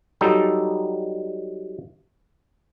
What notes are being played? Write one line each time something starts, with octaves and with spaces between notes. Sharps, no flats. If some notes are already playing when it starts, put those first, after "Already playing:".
F#3 G3 D#4 A4